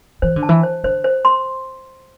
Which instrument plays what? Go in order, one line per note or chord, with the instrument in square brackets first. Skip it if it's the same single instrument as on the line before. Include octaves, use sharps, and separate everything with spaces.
[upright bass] E3 [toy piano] C5
[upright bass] D3
[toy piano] A5
[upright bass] E3
[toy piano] C5
[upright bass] D3 [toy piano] C5
[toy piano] C5
C6